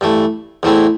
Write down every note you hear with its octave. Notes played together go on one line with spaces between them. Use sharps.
G2 E3 A3
E2 E3 A3 C4 E4